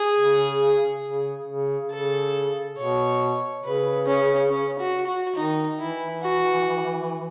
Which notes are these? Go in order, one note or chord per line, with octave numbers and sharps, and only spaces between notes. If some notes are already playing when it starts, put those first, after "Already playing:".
Already playing: G#4
C#3
C#3
C#3
C#3 A4
B2 C#5
C#3 B4
C#4
C#4
F#4
F#4
D#3 D#4
E3 E4
F#4